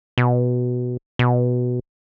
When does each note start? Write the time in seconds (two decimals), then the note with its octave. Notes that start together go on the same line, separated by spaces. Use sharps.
0.18 B2
1.19 B2